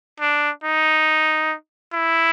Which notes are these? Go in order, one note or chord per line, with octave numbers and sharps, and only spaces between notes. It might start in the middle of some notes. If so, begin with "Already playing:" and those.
D4
D#4
E4